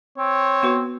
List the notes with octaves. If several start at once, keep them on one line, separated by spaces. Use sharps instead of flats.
C4 C#5
B3 F#4 B4